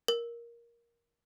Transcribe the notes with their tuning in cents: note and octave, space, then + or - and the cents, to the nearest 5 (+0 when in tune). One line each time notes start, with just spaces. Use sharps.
A#4 +10